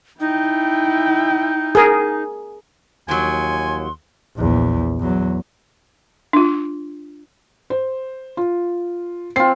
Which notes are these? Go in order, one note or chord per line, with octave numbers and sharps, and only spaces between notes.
D#4 E4 G5
G#4 A#4
D#2 F3 F#3 G#5 C6
A#1 E2
E2 F#3
D4 F4
C5
F4
C4 F4 C7